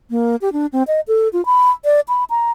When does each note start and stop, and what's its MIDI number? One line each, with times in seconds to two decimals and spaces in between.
0.10 0.36 58
0.41 0.52 67
0.53 0.66 62
0.72 0.83 60
0.87 1.00 75
1.08 1.28 69
1.33 1.44 65
1.46 1.70 83
1.85 2.01 74
2.08 2.24 83
2.30 2.51 82